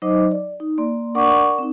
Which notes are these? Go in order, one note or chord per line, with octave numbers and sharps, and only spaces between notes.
F#3 D#4 C5 D#5 D6
D5
D#4
A#3 D5 C6
D4 A#4 D5 F#5 C#6 D6
C4 D#4